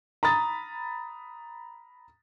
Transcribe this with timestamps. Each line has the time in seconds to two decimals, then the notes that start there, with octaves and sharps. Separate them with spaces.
0.23 A#5 B5 D#6 A6